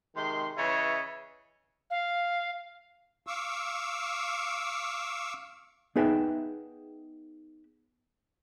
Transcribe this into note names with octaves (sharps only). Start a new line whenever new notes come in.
C3 D#3 G#3 C6
C#3 E3 B4 C#5 D#5 E5
F5
F5 C#6 D6 E6
B3 D#4 G#4 B4 E5 G5